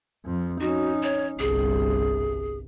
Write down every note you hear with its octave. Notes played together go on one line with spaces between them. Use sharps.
F2 F3
C#4 D#4 F#4
C#5
G1 C2 G#4